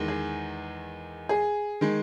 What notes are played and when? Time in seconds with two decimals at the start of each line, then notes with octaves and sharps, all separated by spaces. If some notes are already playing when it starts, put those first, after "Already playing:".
Already playing: E2 D#3 G#3
0.08 G#4
1.29 G#4
1.81 D#3 G#3